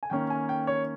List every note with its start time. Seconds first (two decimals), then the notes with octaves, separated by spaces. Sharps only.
0.03 G#5
0.10 D#3 A#3 C#4 G5
0.30 G#5
0.49 G5
0.67 C#5